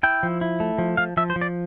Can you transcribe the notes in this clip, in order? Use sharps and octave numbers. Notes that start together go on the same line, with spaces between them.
E4 G5
F3
E4
A3
F3
F3 F5
F3 E5
C5
F3
D5